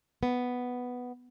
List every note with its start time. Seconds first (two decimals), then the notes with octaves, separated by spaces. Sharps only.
0.23 B3